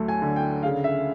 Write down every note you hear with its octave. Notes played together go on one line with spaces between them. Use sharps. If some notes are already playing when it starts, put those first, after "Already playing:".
Already playing: D2 F#3 A3
G#5
D3
G5
C#3 F5
E5